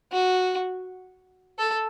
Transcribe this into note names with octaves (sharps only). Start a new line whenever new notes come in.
F#4
A4